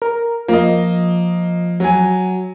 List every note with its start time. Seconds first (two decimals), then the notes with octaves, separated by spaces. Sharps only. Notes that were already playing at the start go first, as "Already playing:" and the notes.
0.02 A#4
0.48 F3 A#3 D#5
1.80 F#3 G#5